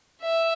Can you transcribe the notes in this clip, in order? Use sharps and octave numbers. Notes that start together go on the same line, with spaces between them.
E5